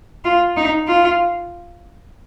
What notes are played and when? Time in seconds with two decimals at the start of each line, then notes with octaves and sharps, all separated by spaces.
0.25 F4
0.57 D#4
0.88 F4